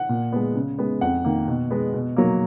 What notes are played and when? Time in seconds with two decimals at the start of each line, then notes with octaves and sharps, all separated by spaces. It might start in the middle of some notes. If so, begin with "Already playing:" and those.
Already playing: F#5
0.09 A#2
0.32 G#3 B3
0.55 C#3
0.79 G#3 B3
1.01 F2 F#5
1.25 D#3 A#3
1.48 B2
1.71 G#3 B3
1.94 B2
2.16 F#3 A#3